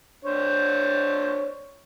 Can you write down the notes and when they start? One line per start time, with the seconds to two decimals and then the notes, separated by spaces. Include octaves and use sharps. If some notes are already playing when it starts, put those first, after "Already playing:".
0.24 D4 C5 C#5